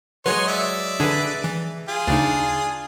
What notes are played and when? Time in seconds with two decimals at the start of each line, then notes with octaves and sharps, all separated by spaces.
0.26 F#3 G#3 B4 C#5 D#5 C6 C#6
0.48 D5 E5
1.00 D3 D4 G#4 B4
1.44 E3
1.88 F4 G#4
2.07 D2 C#3 D4 D#4